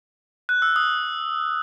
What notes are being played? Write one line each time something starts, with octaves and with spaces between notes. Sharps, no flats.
F#6
E6
D#6